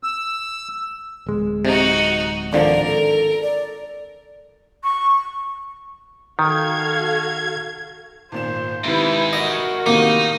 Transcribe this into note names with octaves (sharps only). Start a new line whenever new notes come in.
E6
D1 G#3
C3 D#4 F#4
G#1 D3 F3 A#4 D5
A4
D5
C#6
D#3 F#4 A4 F5 G#6
G#1 A#2 C5 E7
G#2 C3 D#3 E4 B4
F#4 A#4 D#5
A2 C3 D#3 A#3 D#4